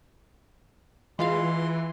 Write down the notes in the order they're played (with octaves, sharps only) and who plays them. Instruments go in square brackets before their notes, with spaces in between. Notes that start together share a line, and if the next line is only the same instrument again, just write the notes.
[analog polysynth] E3 [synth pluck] G#3 F4 F5 [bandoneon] C6